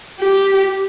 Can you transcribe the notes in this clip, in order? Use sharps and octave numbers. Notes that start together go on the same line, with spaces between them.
G4